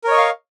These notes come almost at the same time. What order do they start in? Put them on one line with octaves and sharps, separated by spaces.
A#4 C#5 D#5 C#6 F5